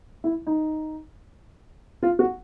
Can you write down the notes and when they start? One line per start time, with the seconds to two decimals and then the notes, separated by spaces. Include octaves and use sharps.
0.24 E4
0.47 D#4
2.03 F4
2.19 F#4